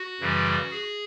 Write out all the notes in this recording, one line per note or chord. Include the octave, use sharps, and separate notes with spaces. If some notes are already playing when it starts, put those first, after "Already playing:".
Already playing: F#4
F#2 C#3 E3 G3
G#4